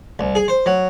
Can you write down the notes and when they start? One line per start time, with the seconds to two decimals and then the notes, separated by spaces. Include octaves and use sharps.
0.19 C2
0.35 G#4
0.48 C5
0.66 F#3